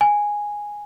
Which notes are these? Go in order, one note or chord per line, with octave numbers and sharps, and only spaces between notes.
G#5